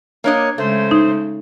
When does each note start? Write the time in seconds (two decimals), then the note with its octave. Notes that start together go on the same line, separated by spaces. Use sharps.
0.24 A#3 D4 C#5 D#5
0.58 C#3 G#3 A3 C5
0.91 D#4